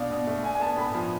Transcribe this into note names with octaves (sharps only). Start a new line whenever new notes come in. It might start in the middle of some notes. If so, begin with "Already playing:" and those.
Already playing: B2 D4 F5
B2
A3
D4 G#5
G#5
B3 A5
A2 B5
F3